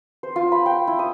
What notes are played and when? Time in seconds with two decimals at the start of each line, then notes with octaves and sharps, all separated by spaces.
0.23 C5
0.36 F4
0.52 B5
0.66 G5
0.87 E4
0.99 D#6